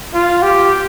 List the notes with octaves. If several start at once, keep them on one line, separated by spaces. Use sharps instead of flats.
F4
G4